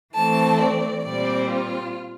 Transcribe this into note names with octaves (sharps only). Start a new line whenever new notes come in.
E3 A3 C4 A5
D5
A#2 G3 C4 D5
F4